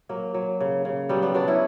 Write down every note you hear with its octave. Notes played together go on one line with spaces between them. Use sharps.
F#3 A#3
F#3
C#3
C#3
F#3 G3 B3
G3 B3
F#3 B3 D4
C#4 E4